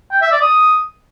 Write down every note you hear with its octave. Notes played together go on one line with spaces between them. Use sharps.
G5
E5
D5
D#6